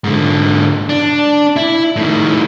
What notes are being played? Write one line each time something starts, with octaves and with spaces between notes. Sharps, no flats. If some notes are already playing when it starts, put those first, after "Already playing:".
G#2 D3
D4
E4
A2 D#3